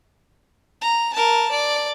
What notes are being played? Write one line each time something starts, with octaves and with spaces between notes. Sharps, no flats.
A#5
A#4 A5
D5